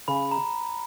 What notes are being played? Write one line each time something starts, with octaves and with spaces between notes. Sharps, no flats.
C#3 B5
A#5